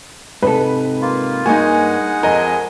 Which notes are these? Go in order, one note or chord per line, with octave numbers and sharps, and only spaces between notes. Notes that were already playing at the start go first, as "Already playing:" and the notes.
G#2 C3 A4 B4
A#3 F4
G2 G#3 A#3 D#4 F#4 F#5 G#5
F2 A#4 D#5 G#5